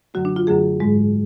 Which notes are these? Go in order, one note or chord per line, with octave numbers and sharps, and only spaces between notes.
F#2 D3 F#3 A3 F#4
D4
F4
F#2 D3 F#3 A3 G#4
G#2 G#3